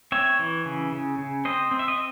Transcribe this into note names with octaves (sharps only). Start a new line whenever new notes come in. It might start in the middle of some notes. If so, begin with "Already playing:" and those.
C4 C#5 E5
E3
C#3
C#3
C#3
C4 C5 D#5
C4
E5
D#5